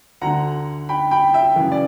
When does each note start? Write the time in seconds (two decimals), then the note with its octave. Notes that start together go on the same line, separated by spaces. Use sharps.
0.21 D2 D3 F#5 A#5
0.89 G5 B5
1.11 G5 B5
1.34 E5 G5
1.56 F#2 C#3 E3
1.72 D5